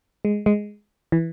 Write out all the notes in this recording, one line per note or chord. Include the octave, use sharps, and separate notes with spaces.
G#3
G#3
E3